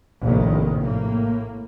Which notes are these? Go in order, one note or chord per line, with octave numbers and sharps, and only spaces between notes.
F1 A#1 A2 D#3
A2 A#3